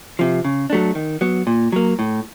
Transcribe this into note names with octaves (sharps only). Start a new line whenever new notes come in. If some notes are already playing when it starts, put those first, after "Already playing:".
C3 F3
C#3
F#3 A3 D4
D#3
F#3 B3
A#2
F#3 A#3
A2